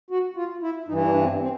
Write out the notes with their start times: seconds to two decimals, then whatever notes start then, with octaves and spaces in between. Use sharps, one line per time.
0.10 F#4
0.36 F4
0.62 E4
0.88 G2 E3 D#4
1.06 D4
1.23 C4
1.41 C4